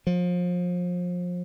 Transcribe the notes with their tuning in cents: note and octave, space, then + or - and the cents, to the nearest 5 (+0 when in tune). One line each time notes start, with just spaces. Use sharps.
F3 +30